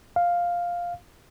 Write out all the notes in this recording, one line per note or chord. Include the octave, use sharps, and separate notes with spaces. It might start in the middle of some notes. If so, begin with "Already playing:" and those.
F5